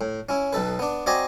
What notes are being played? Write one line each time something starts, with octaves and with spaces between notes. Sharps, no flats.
A2
C#4 E4
B1 B2 A4 B4
B3 D4
C4 F#4 D5 D#5 G#5 A#5